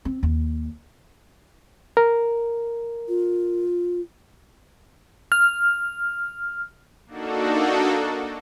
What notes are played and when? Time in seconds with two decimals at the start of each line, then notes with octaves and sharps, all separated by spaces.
0.05 C4
0.23 D#2
1.97 A#4
3.08 F4
5.32 F6
7.06 A#3 D4 D#4 F#4 A4